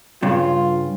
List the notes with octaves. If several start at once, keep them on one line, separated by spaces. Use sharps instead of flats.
G2 C#3 F4